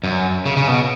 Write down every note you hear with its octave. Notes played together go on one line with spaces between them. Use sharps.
F#2
C#3
C#3
B2